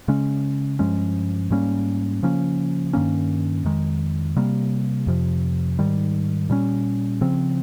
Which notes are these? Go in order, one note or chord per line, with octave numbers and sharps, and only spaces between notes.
C#3 G#3 C#4
G2 F3 G#3 C#4
G#2 G3 A#3 C#4
C#3 F3 A#3 C#4
G2 D#3 A#3 C#4
F2 D#3 G#3
C3 G3 A#3
F2 C3 F3
G#2 D#3 G3
A#2 G3 C#4
C#3 F3 C4